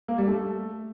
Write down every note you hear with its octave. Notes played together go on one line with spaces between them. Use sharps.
A#3
G3
A3